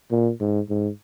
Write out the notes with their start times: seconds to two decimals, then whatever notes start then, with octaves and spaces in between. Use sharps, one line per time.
0.11 A#2
0.40 G#2
0.69 G#2